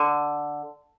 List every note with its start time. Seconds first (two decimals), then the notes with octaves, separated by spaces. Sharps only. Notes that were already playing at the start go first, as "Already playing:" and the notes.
Already playing: D3